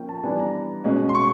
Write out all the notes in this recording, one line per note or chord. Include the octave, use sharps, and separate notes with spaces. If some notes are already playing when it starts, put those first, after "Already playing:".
Already playing: F3 A#3 C#4 G5
A5
E3 G3 B3 D4 G#5
A#5
B2 G#3 C#4
C6
C#6